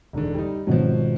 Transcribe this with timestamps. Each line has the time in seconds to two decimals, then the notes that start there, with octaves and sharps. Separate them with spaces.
0.13 E1 G#2 D3
0.34 G3 D#4
0.67 G#1 B2 F3 F#3